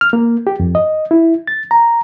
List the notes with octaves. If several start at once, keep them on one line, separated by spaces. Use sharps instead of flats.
F6
A#3
G4
F2
D#5
E4
A6
A#5